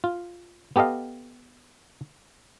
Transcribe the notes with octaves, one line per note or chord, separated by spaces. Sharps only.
F4
B3 G4 A4 D#5 F5